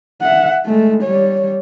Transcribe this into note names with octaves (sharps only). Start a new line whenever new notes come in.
E5 F#5
G#3 A3
G3 C#5